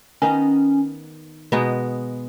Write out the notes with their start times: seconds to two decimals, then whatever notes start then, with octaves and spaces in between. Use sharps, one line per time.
0.22 D#3 B3 C#4 D#4
1.52 B2 G#3 B3 D#4